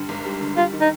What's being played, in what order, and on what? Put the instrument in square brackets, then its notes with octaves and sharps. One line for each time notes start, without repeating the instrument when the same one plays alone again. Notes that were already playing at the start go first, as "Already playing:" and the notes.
Already playing: [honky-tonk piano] G2 D3 G3
G#1
G3
D3
[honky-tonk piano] G3 [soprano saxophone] F4
[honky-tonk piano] D#3
[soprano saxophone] D#4